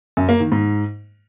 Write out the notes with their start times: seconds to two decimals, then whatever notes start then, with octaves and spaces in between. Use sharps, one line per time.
0.17 F#2
0.29 A#3
0.40 D#3
0.52 G#2